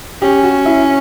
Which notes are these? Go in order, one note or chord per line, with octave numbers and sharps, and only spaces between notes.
C#4 G4
F#4
E4